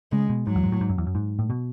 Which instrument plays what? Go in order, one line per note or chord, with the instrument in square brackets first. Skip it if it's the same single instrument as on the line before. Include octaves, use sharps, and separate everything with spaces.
[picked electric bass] C#3 [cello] G#3
[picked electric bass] B2
[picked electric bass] G#2 [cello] F#3
[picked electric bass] E2
G#2
A2
G#2
F#2
E2
F#2
G#2
A2
B2